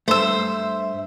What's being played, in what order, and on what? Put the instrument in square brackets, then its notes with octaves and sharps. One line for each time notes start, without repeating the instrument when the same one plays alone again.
[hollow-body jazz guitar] G2 A3 [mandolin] C5 E6 [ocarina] E5